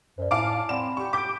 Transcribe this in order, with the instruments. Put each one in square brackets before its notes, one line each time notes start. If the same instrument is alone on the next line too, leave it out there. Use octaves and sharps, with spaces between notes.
[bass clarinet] F#2 [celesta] C5 D5
[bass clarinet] A2 [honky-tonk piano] F5 A5 D6 [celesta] G#5 D7
[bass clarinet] C4 [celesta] D5 F#5 B5 [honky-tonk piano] E7
[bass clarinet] G4 [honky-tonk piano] C#6
[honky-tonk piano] D6 G6 [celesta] B6 D7